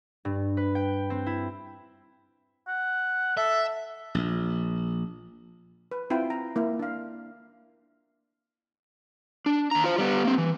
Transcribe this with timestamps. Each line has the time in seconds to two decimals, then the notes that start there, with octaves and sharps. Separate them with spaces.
0.25 G2
0.57 B4
0.75 G5
1.10 C4
1.26 E4
2.68 F#5
3.37 A4 E5
4.15 A#1
5.91 B4
6.10 C4 E4 F4 F#5 G5 B5
6.30 G5 A#5
6.56 A#3 E4
6.79 D4 F5
9.46 D4
9.71 D#2 A#5
9.84 F4 C5
9.98 G3 B3
10.25 A#3 C4
10.38 E3